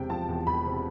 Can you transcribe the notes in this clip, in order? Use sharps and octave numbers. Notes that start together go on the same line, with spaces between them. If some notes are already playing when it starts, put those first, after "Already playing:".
Already playing: E1 C3 G5
F3 A5
E2
E1 B5
C3